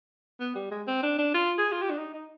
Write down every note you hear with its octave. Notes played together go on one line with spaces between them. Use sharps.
B3
G3
G#3
C4
D4
D4
F4
G#4
F4
G4
D4
D#4
D#4